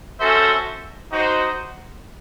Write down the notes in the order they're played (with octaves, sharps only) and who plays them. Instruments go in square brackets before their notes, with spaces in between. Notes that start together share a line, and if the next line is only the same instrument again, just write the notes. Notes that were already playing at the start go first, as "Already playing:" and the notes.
[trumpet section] C#4 F#4 A4 C5 E5
D#4 F#4 C5